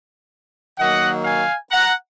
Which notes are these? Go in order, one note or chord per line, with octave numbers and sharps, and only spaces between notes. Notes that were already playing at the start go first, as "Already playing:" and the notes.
D#3 F#3 A#3 D#5 F#5
F5 G#5
F#5 A#5